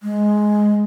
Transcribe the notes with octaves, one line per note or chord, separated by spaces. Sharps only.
G#3